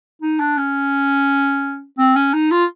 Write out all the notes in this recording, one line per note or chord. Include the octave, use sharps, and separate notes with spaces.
D#4
D4
C#4
C4
C#4
D#4
F4